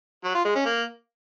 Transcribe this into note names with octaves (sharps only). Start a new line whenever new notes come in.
F#3
F4
G#3
C#4
A#3